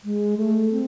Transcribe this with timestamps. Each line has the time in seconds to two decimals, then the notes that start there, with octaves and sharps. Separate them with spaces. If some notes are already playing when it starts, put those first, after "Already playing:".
0.04 G#3
0.37 A3
0.72 C4